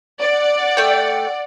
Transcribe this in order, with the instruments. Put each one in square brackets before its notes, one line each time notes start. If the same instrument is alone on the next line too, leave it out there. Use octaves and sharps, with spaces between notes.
[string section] D5 F#5
[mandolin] A3 G5